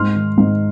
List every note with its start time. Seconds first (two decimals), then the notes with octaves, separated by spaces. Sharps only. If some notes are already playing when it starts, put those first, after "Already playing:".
Already playing: G#2 C6 F6
0.16 D#3
0.38 G#2